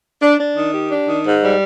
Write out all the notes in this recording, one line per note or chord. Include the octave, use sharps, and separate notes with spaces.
D4
D4
D#3
G4
D4
D#3
G#2
G3